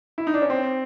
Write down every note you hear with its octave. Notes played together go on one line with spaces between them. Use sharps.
E4
D#4
D4
C#4
C4